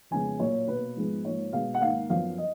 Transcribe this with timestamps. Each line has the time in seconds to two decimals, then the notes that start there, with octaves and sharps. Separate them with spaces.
0.11 F2 C#3 G#3 B3 G#5
0.39 A#2 F#3 A#3 C#5
0.67 B2 A#3 B4
0.96 G#2 F3 G#3 B3
1.24 G#2 F3 A#3 C#5
1.53 B2 G#3 B3 F5
1.74 F#5
1.81 G#2 D#3 A#3 F5
2.10 F#2 F3 B3 F5
2.38 D#5